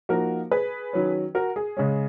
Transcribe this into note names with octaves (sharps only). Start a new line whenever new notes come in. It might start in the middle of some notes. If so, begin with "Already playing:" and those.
F3 A#3 D#4 F#4 A#4
G#4 B4
D#3 F#3 C#4
F#4 A#4
G#4
C#3 G#3 C#4